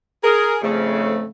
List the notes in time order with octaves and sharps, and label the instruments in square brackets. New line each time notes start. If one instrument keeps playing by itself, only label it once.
[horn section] G#4 [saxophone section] A#4
[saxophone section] F2 G#2 C#3 [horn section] A3